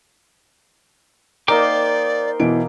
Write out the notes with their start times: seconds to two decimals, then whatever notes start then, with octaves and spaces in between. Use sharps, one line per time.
1.48 A#3 D#4 A#4 C5 D5 G5 D6
2.40 B2 E3 D7